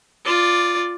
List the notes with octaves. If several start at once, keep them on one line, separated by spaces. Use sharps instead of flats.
F4 D5